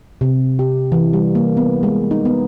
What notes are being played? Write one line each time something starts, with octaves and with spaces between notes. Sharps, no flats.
C3
G4
E3
G3
A#3
B3
G#3
D#4
B3